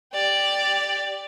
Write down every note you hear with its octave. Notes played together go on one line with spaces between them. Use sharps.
G4 D5